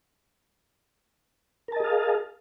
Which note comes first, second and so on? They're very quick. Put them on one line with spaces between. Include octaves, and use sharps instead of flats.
A#4 A5 D#5 G#4 F5